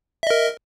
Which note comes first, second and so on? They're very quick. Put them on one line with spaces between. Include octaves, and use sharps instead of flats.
E5 D#5 A#4